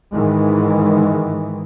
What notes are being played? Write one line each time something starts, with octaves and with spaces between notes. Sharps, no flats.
G#2 D#3 E3 G#3